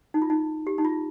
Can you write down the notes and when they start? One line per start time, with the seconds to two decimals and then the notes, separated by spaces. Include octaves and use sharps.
0.14 D#4
0.22 F4
0.30 D#4
0.67 G4
0.78 D#4
0.85 F4